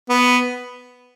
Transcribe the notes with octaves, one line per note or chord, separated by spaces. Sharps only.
B3